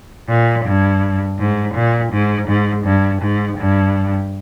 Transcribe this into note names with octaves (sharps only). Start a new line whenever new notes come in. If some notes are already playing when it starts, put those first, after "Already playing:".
A#2
G2
G#2
A#2
G#2
G#2
G2
G#2
G2